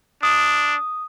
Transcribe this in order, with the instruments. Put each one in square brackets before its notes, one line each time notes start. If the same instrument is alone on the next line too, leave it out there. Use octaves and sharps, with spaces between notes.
[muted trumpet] D4 [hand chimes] D#6